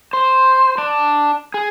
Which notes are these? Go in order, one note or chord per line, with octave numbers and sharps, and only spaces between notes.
C5
D4
G#4